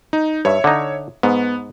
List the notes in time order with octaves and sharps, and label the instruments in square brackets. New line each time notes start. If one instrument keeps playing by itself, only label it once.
[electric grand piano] D#4
[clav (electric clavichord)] G2 [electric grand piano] C#5 E5
[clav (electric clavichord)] D3 D#4
[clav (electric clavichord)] G#2 [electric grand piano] B3